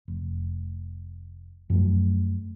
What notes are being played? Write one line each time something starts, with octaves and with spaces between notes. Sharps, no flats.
F1
F#2 F3 F#3 A3